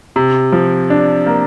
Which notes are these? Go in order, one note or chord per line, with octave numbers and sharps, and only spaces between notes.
C3
F3
D4
A#3